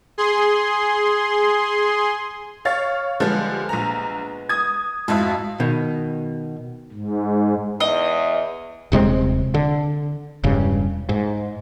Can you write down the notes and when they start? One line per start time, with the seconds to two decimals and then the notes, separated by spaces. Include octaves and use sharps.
0.18 G#4 C6
2.65 C#5 F5 A6
3.20 D3 F3 G3 G#3 B3
3.69 A#1 A#5
4.49 D#6 G#6
5.08 F2 G#2 E4 F#4 F5
5.60 B2 D#3
6.92 G#2
7.80 E2 D#5
8.92 D#1 C3 G#3 C4
9.54 D3
10.44 E1 G2 C#3
11.09 G#2